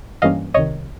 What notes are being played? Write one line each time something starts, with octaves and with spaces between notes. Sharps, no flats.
G2 E3 G3 A#3 C#4 D#5 F5
C2 C3 D#3 C#5 D#5